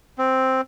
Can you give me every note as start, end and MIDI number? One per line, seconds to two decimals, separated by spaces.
0.18 0.61 60